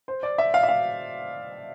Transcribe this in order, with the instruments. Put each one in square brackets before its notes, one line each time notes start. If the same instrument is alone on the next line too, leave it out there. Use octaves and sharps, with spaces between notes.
[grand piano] C5
D5
E5
F5
E5
F5